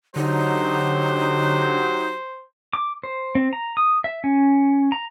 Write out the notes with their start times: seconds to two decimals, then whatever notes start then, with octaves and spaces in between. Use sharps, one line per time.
0.16 D3 F#3 D#4 G4 C5
2.73 D6
3.04 C5
3.35 C4
3.53 A#5
3.77 D#6
4.04 E5
4.24 C#4
4.92 A#5